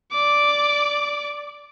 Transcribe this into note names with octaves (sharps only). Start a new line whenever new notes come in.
D5 D6